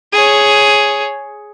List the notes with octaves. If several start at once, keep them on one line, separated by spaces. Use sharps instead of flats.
G#4 C#5